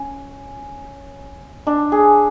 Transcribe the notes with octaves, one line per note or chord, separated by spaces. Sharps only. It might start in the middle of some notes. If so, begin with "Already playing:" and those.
Already playing: C#4
D4
G#4